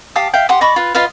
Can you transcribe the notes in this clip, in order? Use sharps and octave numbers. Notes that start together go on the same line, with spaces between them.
G4 F5 A5 D#6
E5 F5 G5
G4 F#5 C6 D#6
D5 D#5 B5 C#6
F4 B4
F4 B4 D#5 F5